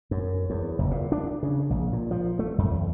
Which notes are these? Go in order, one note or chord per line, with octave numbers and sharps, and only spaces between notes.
F#2
E2
F#1
A#2
D4
C#3
A#1
A#2
F3
A3
F#2
E2